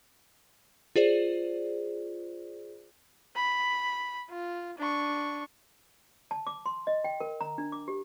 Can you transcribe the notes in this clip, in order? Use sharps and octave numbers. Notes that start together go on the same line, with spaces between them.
F4 G#4 C5 D5
B5
F4
D4 C#6
A5
D6
C6
D#5
G5
A#4
A#5
D4
D6
G4